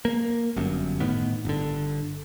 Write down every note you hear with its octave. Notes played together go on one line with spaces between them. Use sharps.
A#3
G1 F#2
A2 D#3 B3
G1 D3